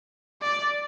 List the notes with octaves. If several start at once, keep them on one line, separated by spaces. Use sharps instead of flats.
D5